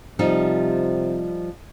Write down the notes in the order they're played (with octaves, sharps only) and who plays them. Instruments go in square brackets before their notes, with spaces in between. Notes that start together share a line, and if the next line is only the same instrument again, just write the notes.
[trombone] C3 [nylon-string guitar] F3 G3 D#4